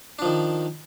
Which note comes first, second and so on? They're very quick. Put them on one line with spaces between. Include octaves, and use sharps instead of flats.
D4 F3 D#3